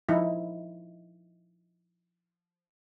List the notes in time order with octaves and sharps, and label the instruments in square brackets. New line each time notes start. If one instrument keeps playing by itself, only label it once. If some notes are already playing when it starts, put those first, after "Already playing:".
[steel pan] F3 D#4 E4